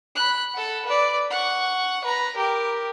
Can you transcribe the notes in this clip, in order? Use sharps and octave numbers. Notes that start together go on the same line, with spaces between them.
B5 F#6
A4 F#5
B4 D5
F#5 C#6
B4 A#5
G4 A#4